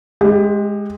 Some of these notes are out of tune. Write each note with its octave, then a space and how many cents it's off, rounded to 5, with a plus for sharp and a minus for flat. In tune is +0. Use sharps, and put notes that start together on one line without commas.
G#3 +0 G4 +25